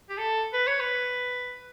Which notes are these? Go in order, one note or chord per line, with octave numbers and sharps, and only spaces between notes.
G4
A4
B4
C#5
B4